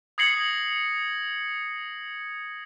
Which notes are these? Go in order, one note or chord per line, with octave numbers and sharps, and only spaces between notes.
D#6 G#6 A#6 C7 C#7 F#7